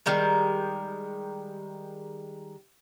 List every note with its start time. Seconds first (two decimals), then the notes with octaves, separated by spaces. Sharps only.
0.06 D#3 G3 G#3 A#4